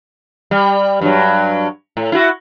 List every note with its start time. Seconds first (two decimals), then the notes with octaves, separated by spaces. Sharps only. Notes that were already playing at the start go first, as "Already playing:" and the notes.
0.51 G3
1.01 G2 F#3
1.97 A2
2.12 E4 F#4